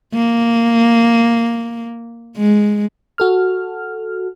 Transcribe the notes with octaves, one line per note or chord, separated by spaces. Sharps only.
A#3
G#3
F#4 A4 F6